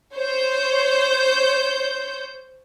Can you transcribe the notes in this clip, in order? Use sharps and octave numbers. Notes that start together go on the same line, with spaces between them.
C5 C#5 G6